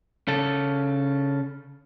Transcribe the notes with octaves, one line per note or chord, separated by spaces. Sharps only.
C#3 A4